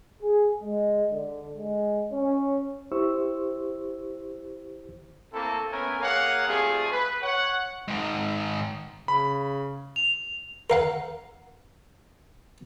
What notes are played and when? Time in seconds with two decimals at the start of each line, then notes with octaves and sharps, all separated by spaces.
0.22 G#4
0.63 G#3
1.12 D3
1.58 G#3
2.13 C#4
2.92 E4 G4 C5 C#6 E6
5.33 A3 A#3 C4 E4 A4
5.72 A3 B3 C#4 A#4 G#5
6.01 A#3 G#4 A#4 C#5 F5 F#5
6.47 G3 A3 C4 F4 G#4
6.92 B4
7.23 C#5 F#5
7.88 G#2 D#3
9.08 C#3 B5
9.96 F7
10.70 A#4 F5 F#5